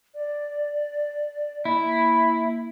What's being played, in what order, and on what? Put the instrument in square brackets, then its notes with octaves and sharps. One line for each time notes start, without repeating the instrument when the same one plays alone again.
[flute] D5
[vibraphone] A#3 [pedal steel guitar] E4 [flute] B5